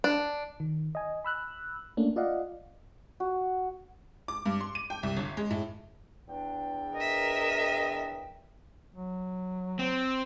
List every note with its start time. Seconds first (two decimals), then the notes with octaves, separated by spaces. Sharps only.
0.04 D4
0.60 D#3
0.95 D#5 G#5
1.25 B5 E6 F#6
1.97 A3 A#3 C#4 D4
2.16 F4 D5 D#5 F5 F#5
3.20 F#4
4.28 D6
4.46 G2
4.61 C6
4.75 D#7
4.90 G5
5.03 C2
5.17 G1
5.37 G#3
5.51 A2
6.28 E2 D4 G5
6.95 A#4 D#5 E5
8.95 F#3
9.79 C4